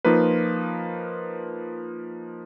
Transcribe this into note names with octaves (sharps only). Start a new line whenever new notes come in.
F3 A#3 D#4 F4 B4